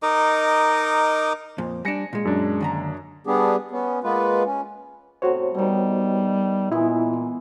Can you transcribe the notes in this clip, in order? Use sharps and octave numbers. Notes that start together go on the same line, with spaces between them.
D#4 A#4 D#5 D6
F2 A#2
G3 D4 G#5 A#6 C#7
A#2 G#3
F#2 D4
D#2 D3 A#5
G3 B3 D4 G4 G#4
B3 C#4
G#3 A#3 B3 F4 B4
C#4
A2 C3 F#4 C5 C#5
B2 D#3 G3
A#2 E3 G#3 B3 E4